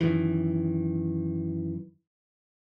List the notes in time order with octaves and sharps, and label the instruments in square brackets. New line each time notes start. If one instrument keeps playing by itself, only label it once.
[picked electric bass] F#2 D#3 E3